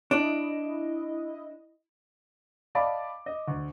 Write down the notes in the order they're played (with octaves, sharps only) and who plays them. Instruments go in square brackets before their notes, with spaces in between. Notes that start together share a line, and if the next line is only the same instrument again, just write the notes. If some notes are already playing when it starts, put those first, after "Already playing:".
[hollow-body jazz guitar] D4 [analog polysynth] E4 D#5
[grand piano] D5 D#5 F5 A5 B5 D6
D#5
D2